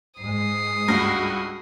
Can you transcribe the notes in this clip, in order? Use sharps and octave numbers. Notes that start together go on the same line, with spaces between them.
G#2 G#3 D#6 C7
C#2 G2 F#4 A#6